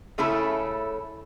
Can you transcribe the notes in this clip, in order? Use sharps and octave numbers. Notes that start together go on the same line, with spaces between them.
C#3 A3 C#4 E4 A4